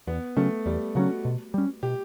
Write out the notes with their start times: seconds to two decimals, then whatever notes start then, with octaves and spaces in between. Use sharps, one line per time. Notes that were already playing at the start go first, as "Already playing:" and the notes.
0.07 E2 B3
0.37 C#3 F#3 A3 C#4
0.66 E2 G3
0.95 C#3 F#3 C#4 F#4
1.25 B2
1.54 G3 C#4
1.83 B2 G4